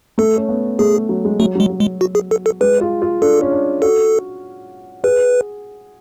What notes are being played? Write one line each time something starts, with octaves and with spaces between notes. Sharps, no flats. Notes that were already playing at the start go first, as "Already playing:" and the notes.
A3 A4
C#4
B3
A3 G#4
F#3
G#3
F#3 A3
F#3 G#3
F#3
G#3
F#4
G#4
A4
A4
G#3 B4
F4
F4
D4 A4
C#4
D4
F#4 A4
G#4 B4